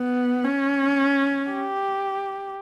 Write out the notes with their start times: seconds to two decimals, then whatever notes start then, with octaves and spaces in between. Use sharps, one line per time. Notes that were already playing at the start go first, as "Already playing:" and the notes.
Already playing: B3
0.44 C#4
1.50 G4